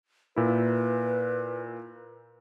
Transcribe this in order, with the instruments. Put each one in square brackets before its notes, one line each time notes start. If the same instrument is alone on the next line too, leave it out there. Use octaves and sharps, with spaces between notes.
[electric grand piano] A#2 E4 [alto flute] B4